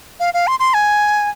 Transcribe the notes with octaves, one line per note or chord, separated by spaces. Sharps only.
F5
F5
C6
C6
G#5